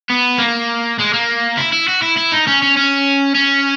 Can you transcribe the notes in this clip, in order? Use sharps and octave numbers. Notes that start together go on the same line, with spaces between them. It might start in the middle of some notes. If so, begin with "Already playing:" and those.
B3
A#3
G#3
A#3
E4
E4
F#4
E4
E4
D#4
C#4
C#4
C#4
C#4